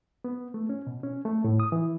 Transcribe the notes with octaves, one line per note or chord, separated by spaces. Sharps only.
B3
A3
C#4
B2
C#4
A3
A2
D#6
E3